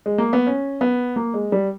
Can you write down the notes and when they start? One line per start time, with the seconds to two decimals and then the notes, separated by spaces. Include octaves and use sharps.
0.06 G#3
0.18 A#3
0.33 B3
0.46 C#4
0.81 B3
1.16 A#3
1.34 G#3
1.52 G3